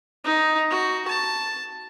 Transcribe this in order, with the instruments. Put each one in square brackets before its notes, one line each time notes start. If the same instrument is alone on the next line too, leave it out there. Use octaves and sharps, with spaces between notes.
[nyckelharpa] D#4
F#4
A5